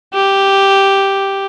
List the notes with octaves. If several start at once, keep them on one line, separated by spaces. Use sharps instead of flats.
G4